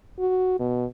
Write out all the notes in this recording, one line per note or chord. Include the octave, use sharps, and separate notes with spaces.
F#4
B2